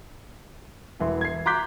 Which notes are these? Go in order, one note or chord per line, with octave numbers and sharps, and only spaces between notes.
E1 E3 E4 C6
G#6 C7
A#5 C6 D6 F#6 G6 B6